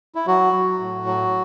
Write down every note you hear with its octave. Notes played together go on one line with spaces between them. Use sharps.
E4
F#3 F#4
F#3
A2
F#3